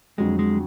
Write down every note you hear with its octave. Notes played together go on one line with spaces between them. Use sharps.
F2 D3 F#3 G#3
G#3